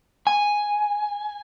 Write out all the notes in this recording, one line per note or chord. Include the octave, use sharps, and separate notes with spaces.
G#5